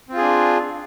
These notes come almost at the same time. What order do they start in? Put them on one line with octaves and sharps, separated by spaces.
C4 F4 G#4 D4